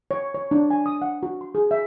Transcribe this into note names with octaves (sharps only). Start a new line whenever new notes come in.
C#5
C#5
D4
G#5
D#6
F#5
F#4
C6
G#4
E5